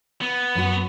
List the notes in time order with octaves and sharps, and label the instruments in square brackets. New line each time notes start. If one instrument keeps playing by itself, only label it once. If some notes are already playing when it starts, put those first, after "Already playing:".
[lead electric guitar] B3
[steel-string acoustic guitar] F#2 F#4